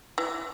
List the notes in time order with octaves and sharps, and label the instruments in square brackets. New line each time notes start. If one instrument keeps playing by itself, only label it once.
[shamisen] E3